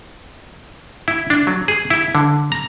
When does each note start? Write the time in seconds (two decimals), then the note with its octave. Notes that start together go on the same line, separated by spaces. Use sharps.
1.08 E4
1.30 D4
1.47 F#3
1.68 G#4
1.90 E4
2.15 D3
2.52 A#5